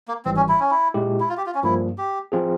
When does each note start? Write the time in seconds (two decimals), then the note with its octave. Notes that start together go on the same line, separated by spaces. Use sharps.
0.08 A#3
0.25 G#1 G#2 E3 G3 C4
0.37 C#4
0.49 E4
0.60 C#4
0.71 E4
0.94 A#2 G#3 E4 G4
1.20 E4
1.29 F4
1.37 G4
1.46 F4
1.55 C#4
1.63 G2 F3 A#3 E4
1.98 G4
2.32 F3 C4 F4 G#4